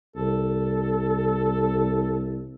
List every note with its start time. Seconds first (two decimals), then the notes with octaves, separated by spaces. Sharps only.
0.16 C2 A4